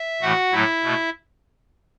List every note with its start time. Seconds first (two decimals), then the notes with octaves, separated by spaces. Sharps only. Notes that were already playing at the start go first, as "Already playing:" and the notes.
Already playing: E5
0.21 A2 E3 A3 F#4 F#5
0.53 A2 F#3 A3 E4 E5
0.83 B2 A3